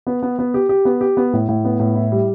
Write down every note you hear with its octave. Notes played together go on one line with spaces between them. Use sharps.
B3
B3
B3
G4
G4
B3
G4
B3
A2
A2
B3
A2
E4
G3